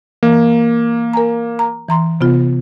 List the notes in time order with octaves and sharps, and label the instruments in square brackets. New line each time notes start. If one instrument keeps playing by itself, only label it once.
[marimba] E3 [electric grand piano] A#3
[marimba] A#4 G#5 A#5
A#5
E3 A#5 C6
C3 B3 F4